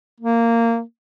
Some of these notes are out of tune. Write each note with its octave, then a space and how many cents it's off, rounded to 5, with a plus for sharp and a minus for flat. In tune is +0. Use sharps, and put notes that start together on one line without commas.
A#3 -15